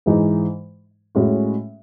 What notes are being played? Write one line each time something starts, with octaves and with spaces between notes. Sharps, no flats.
G#2 E3 G#3 D#4
A2 G#3 C#4 F#4